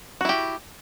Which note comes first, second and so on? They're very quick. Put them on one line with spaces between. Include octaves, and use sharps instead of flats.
F#4 E4 G4